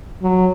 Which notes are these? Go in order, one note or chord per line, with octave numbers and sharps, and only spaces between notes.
F#3